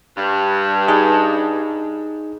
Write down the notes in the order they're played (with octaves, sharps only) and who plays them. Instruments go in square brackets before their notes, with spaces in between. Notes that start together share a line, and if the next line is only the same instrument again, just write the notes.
[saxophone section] G2
[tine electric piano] D#4 G#4